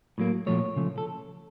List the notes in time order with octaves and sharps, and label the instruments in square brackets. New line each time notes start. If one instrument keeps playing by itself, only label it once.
[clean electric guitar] A2 F#3 A#3
A#2 F3 A3 C#5
C#3 F3 A3
A4